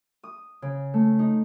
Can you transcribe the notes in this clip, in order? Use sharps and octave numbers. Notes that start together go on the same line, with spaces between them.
D#6
C#3
A3
D#4